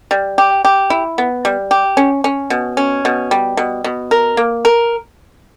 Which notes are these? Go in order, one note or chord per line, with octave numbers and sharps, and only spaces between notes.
G3
G4
G4
E4
B3
G3
G4
C#4
C#4
B2
C#4
B2
G3
B2
B2
A#4
A#3
A#4